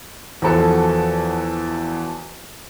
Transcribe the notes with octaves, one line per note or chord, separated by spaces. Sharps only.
E2 F3 F#4 A4